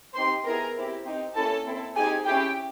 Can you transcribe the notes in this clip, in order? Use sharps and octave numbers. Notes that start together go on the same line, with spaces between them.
C4 D#4 G4 C5 C6
B3 E4 G#4 A#4 A#5
C4 E4 G4
C4 D#4 G4
A#3 C#4 E4 A4 A5
C4 E4 A4
C4 D#4 G4 G#4 G#5
C#4 E4 G4 G#4 G5